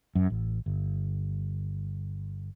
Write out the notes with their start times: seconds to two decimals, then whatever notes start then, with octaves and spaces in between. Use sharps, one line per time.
0.15 F#2
0.30 A1
0.66 G1